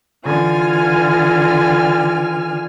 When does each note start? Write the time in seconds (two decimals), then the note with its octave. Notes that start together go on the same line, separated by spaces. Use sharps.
0.25 D3 E3 F4 G#5 F6